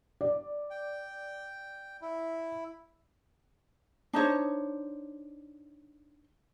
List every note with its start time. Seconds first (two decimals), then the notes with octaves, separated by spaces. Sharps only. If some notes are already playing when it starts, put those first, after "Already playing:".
0.21 D5
0.70 G5
2.02 E4
4.13 D4 D#4 C5 C#5